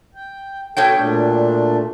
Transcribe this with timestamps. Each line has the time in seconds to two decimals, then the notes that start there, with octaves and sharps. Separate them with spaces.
0.15 G5
0.77 B2 F#4 A4 C#5 G5
0.96 A#2 A3 D4